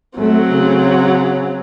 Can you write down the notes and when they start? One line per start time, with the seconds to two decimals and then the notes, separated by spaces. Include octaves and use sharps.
0.18 F#3 A3 C4
0.53 C#3